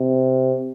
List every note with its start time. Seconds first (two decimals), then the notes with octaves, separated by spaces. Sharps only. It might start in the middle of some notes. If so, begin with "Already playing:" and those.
Already playing: C3